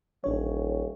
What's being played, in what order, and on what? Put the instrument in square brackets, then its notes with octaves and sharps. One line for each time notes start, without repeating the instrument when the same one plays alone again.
[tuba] D#1 [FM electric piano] A1 D4 C#5